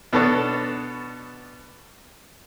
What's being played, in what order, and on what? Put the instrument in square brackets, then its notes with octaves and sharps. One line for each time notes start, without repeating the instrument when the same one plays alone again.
[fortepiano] B2 B3 D4 A4 C#5